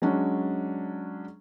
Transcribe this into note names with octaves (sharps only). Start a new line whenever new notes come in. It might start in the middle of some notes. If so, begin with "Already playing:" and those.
F#3 G#3 C#4 D4